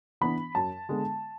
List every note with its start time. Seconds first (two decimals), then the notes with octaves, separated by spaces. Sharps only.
0.21 E3 B3 D4 B5
0.55 F#2 A5
0.89 D3 G#3 B3